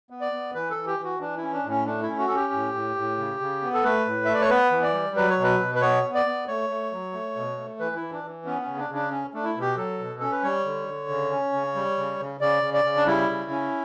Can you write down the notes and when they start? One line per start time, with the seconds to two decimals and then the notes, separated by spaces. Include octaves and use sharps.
0.10 B3
0.21 D5
0.32 B3
0.54 E3 B4
0.71 A4
0.76 E3
0.87 G4
0.98 E3
1.04 F#4
1.20 E3 D4
1.37 C#4 E4
1.53 D4
1.64 A2
1.70 C#4
1.86 A3 D4
2.03 E4
2.08 C#4
2.19 F#4
2.28 C#4 A4
2.35 G4
2.52 A2
2.74 A2
2.96 A2
3.18 C#3
3.40 C#3
3.62 B3
3.74 A4
3.84 A3 B4
4.06 A2
4.25 A3 E5
4.33 D5
4.42 C#5
4.49 B3 B4
4.71 E3
4.83 D5
4.94 G3
5.16 F#3 B4
5.29 C#5
5.38 B2
5.43 B4
5.60 B2
5.75 B4
5.81 B3 C#5
6.03 B3
6.15 D5
6.26 B3
6.48 A3 C#5
6.70 A3
6.92 F#3
7.13 A3
7.36 B2
7.58 A3
7.79 E3 B4
7.96 E4
8.01 E3
8.12 D4
8.23 E3
8.45 B3 C#4
8.62 C#4
8.67 C#3
8.78 D4
8.89 C#3
8.95 D4
9.11 C#4
9.34 A3 D4
9.44 E4
9.55 B2
9.61 G4
9.77 F#3 A4
9.99 B2
10.20 C#4 A4
10.31 B4
10.43 G3 C#5
10.65 D3
10.87 D3
11.09 C#3
11.31 C#4
11.53 C#3
11.75 G3
11.97 C#3
12.19 C#3
12.41 C#3 D5
12.63 C#3
12.74 D5
12.84 C#3
12.96 D4
13.07 G3 E4
13.29 C#3
13.51 C#4